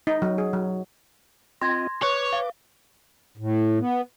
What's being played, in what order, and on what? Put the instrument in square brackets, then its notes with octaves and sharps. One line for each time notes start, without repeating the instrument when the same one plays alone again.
[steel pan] D#4
F#3
G#4
F#3
[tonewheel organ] C4 F4 D#5 [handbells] C6 G#6 A#6
[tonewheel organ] B4 D6 [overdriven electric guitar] C#5
[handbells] F5
[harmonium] A2
B3